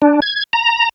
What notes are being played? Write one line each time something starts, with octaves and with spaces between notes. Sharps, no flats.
D4
G#6
A#5